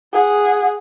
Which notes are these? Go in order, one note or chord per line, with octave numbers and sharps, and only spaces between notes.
G#4 F#5